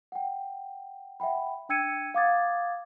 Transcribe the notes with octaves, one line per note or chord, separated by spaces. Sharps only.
F#5 G5
E5 F#5 G5 B5
D4 G5 E6 G#6 C#7 D#7
F5 F#5 D6 D#6 G#6 A6